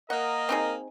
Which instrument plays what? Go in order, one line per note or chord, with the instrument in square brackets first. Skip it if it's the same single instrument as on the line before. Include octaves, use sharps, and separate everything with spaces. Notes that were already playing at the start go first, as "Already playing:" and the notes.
[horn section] A#3 A#4 D#5 [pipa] F#5
[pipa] C4 D#4 G#4